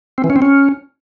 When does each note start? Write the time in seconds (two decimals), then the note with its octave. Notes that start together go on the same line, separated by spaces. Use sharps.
0.18 C4
0.24 E3
0.30 C#4
0.36 C4
0.42 C#4